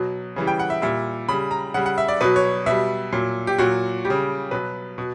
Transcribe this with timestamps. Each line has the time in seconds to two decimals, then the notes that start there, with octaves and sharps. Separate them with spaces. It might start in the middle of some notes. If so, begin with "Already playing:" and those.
Already playing: B2 F#3
0.36 C#3 E3 G3
0.47 G5
0.59 F#5
0.70 E5
0.82 A#2 G3 E5
1.29 C#3 G3 B5
1.51 A#5
1.74 C#3 G3 F#5
1.86 F#5
1.98 E5
2.08 D5
2.21 B2 F#3 B4
2.36 C#5
2.66 B2 G3 E5
3.12 A#2 F#3
3.47 G4
3.58 A#2 F#3 F#4
4.05 G3 G4
4.10 C#3
4.51 B2 F#3 B4
4.98 B2